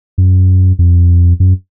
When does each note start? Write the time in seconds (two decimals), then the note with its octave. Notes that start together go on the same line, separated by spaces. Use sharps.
0.18 F#2
0.79 F2
1.40 F#2